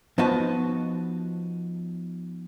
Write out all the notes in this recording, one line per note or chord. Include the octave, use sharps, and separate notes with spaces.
F3 B3 D#4 F#4 D#5 A5